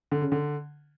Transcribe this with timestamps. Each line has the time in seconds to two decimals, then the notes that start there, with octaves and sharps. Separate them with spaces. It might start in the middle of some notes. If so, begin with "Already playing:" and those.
0.12 D3
0.22 C#3
0.32 D3